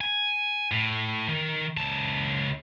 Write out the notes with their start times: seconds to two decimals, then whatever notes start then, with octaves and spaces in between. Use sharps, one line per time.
0.01 G#5
0.72 A2
1.28 D#3
1.77 C#2 A5